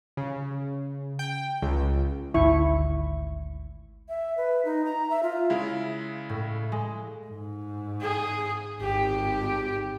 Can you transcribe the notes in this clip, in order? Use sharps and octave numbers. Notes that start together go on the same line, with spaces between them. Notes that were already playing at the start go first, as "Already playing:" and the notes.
C#3
G5
C#2
G#1 D2 G#2 E4 C#6
E5
B4
D#4
A#5
E5
F4
C#3 G#3 E4 F5
A2
G#3
G#2
G#4
G#1 G4